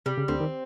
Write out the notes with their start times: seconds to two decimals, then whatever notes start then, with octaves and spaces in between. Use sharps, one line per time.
0.06 C3 G3
0.17 C#3
0.28 D2 D3 C4
0.40 D#3